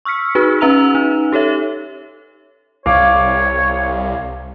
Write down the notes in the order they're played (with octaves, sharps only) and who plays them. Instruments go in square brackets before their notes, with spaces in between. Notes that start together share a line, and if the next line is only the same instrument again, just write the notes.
[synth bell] C#6 E6 F6 B6 C#7
D#4 F#4 G#4 B4
C#4 B4 E5 A#5 E6 F7
D#4
G4 A4 C#5 E5
[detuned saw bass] C2 [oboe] C#5 [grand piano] F5 D6